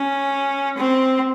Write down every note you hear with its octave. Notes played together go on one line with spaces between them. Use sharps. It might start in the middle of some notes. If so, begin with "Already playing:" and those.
Already playing: C#4
C4